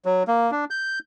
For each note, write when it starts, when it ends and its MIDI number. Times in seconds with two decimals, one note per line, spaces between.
0.05 0.23 54
0.28 0.51 58
0.51 0.65 62
0.70 0.99 91